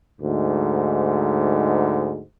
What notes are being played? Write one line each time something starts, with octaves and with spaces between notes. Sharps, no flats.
D2 G#2